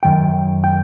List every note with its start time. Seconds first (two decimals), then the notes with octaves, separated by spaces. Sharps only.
0.03 F#2 D#3 G5
0.64 G5